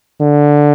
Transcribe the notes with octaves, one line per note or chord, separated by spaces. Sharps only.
D3